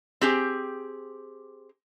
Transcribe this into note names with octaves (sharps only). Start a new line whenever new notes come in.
C4 G4 G#4